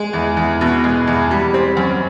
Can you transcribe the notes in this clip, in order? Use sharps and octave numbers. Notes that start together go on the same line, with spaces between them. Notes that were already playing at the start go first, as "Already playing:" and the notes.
Already playing: G#3
E2
E2
B2
G#3
E2
G3
C4
F#2